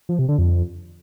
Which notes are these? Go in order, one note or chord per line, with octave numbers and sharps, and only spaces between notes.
F3
C3
D3
F2